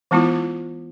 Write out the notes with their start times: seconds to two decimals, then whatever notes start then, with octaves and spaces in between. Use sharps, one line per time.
0.11 E3 G#3 B3 E4 F4